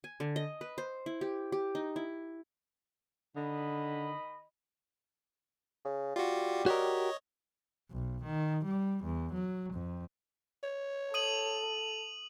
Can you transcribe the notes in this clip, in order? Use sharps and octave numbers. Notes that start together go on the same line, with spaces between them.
G#5
D3
D#5
B4
C5
E4
G4
G4
D#4
E4
D3 D#3 D#5 B5
C#3
G3 F4 F#4
F#4 G4 A#4 C#5 D#5
B1
D#3
G3
E2
F#3
F2
C#5
A4 D#6 D#7 F#7